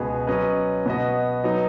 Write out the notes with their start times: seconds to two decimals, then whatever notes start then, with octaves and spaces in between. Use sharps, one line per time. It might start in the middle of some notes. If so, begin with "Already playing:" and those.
Already playing: C#2 B2 B3 G#4
0.27 F#3 C#4 B4 D#5
0.86 B2 B3 F#4 D#5
1.44 F#3 B3 D#4